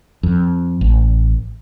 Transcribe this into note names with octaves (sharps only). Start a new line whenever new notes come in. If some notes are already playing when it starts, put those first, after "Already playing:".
F2
A1